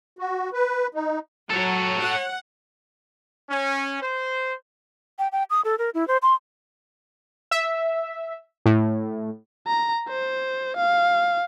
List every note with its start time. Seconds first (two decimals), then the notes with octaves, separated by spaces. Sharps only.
0.19 F#4
0.53 B4
0.95 D#4
1.50 F#3 A4 C#5
2.00 F#5
3.49 C#4
4.02 C5
5.19 G5
5.32 G5
5.50 D#6
5.65 A4
5.78 A#4
5.94 E4
6.08 C5
6.22 C6
7.51 E5
8.66 A2
9.67 A#5
10.09 C5
10.77 F5